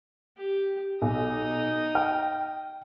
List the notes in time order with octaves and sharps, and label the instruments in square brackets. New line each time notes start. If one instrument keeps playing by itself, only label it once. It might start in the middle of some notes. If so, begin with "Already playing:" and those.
[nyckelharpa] G4
[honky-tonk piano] B1 [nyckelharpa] D#4 D#6
[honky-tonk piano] G5 F6